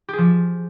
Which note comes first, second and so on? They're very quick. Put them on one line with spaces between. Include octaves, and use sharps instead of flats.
G4 G#4 F3